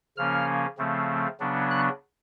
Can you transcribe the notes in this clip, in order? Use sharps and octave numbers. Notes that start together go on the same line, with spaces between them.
C#3 F3 A#3 C#4 F6
C#3 F3 A3 C4
C#3 F#3 B3 D4
F#6